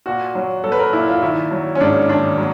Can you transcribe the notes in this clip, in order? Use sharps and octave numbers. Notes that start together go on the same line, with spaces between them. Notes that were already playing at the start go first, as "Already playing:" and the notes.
A#2 F#4
F#3
F#3 A4
B4
A#4
A#2 E4
F4
D#3 E4
F#3
C#4
G#2 D4
D#3 D4
F#3